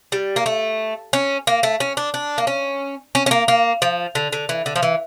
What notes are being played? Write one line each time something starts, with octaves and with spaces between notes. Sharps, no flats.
G3
A#3
A3
C#4
A#3
A3
C#4
D4
D4
A#3
C#4
C#4
C#4
A#3
A#3
F3
D3
D3
E3
D3
F3
E3